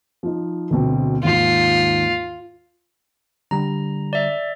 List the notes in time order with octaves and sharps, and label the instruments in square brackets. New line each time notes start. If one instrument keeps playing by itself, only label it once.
[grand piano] F3 D#4
D2 B2 C4
[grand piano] D#2 G#2 [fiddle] F4
[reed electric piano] D3 G3 [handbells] A#5
[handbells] D5 E5